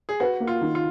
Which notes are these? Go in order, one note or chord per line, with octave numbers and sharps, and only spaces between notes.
G#4
F#4 B4
A#3
F4
D#3
F4